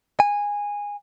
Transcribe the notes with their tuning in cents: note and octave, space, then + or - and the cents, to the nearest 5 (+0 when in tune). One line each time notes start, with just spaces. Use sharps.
G#5 -15